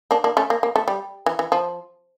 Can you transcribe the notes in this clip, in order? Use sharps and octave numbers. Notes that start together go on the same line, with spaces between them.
A#3 D4
A#3 D4
A3 C#4
A#3
A#3
A3
G3
E3
E3
F3